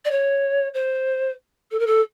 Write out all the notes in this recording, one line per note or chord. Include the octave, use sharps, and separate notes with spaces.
D5
C#5
C5
A4
A#4
A4